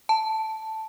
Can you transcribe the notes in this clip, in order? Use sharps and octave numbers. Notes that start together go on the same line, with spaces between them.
A5